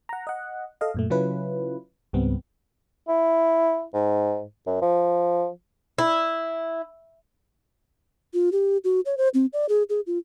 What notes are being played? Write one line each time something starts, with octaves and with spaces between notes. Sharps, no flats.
F#5 A#5
D#5 F#5
A4 D#5 F5
F#2 A#2 A3
C#3 F#3 C#4 E4 F4 B4
C#2 G#2 G3 B3 C4
E4
G#2
F#2
F3
E4
F4
G4
F#4
C#5
C5
C4
D5
G#4
G#4
F4